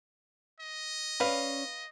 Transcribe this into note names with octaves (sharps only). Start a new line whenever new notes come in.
D#5
C#4 B4 D5 F5